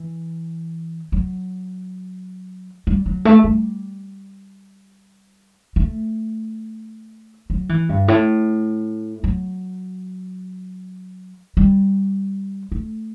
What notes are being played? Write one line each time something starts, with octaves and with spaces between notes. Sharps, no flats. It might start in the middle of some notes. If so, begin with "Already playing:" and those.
Already playing: E3
F#3
G3
F#3
A3
G3
A3
F#3
E3
G2
A2
F#3
G3
A3